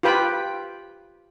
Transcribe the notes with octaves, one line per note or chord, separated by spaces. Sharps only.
F4 G4 B4 G5 B5